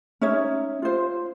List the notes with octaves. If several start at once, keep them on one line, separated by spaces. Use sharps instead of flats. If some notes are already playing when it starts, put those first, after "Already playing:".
C#4 D#4 C#5 E5
F4 C5